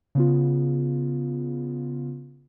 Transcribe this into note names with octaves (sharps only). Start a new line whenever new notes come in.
C#3 B3 F4